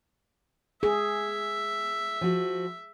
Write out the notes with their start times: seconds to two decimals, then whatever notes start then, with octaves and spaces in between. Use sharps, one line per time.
0.83 G#4 E5
2.21 F3 F#4